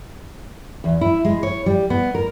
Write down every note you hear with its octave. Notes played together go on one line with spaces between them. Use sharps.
E2
E4
G#3
C#5
G3
B3
A#4